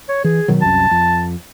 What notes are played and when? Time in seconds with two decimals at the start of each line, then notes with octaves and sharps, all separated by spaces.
0.09 C#5
0.24 E3 G#4
0.48 B2 D#3 F#3
0.62 C2 F#2 A5
0.91 F2